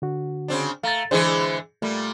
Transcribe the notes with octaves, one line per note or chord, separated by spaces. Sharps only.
D3 F#4
C#3 C4 D4
A3 F5 A#5 A6
D3 E3 G#3 G#4 C5
A#2 G3 A3